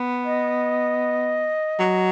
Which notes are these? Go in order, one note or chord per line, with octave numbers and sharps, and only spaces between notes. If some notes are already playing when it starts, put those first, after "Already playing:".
Already playing: B3
D#5
F#3